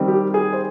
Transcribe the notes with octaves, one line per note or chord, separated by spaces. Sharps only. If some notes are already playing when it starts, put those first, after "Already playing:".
Already playing: D#3 G3 C4
G4
G#4
C5